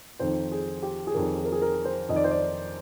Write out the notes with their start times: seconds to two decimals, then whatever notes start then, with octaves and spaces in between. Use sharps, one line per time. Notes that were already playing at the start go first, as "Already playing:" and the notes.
0.19 F2 D#3 C5
0.52 G#4
0.83 G4
1.07 G#4
1.14 F2 D#3 A#4
1.38 G#4
1.45 A#4
1.52 G#4
1.62 A#4
1.85 C5
2.09 F2 D#3 D#5
2.16 D5
2.24 C5
2.31 D5